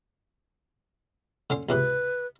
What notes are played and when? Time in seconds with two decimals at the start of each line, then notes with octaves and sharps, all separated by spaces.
1.50 D3 C#4 C6
1.69 C#2 G#2 C3 B4